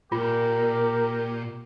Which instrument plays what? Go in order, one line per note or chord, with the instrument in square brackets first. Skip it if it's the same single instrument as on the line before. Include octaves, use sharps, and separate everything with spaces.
[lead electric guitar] A#2 [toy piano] F4 [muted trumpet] G4 [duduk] A#4